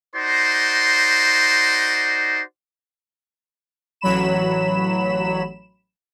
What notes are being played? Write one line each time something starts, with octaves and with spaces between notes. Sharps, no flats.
D#4 F#4 C5 D5 C6
A1 F#3 B5 E7